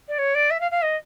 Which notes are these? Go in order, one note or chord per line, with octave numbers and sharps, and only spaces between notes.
D5
C#5
D5
E5
F5
F5
D#5